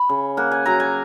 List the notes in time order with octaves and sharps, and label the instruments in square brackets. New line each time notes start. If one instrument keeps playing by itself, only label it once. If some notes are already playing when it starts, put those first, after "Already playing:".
Already playing: [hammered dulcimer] B5
C#3
A#3 F#5
G#5
F#3 A#5
G#5